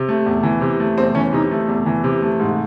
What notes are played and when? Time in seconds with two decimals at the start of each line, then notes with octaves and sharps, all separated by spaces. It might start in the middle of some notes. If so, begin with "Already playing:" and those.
Already playing: C3
0.09 A3
0.26 E2
0.43 E3
0.61 C3
0.80 A3
0.98 E2 C4
1.15 E3 C#4
1.33 C3 D#4
1.51 A3
1.69 E2
1.86 E3
2.04 C3
2.22 A3
2.39 G#2